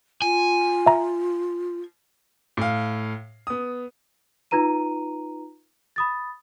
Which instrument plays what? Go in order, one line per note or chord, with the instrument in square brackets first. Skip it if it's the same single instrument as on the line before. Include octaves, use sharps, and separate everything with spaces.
[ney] F4 [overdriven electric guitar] G#5
[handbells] E5 A#5
[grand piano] A2 F5
B3 D#6
[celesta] D#4 F4 B4 A#5 D#7
B5 D#6 A6